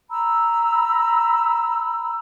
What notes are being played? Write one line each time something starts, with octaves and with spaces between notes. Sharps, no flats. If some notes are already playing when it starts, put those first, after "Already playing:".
A#5 B5 E6